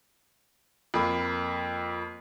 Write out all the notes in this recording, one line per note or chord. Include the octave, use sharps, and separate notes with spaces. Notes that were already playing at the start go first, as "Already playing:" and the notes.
F2 A#3 B5